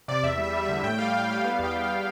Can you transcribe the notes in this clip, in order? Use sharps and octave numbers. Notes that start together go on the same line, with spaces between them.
C3 D5
E2 E5
G3
E5
G3
E5
D3
A2 G5
G3 F5
G3 G5
G3 F5
B3 F5
E2 G5
E2
F5
B3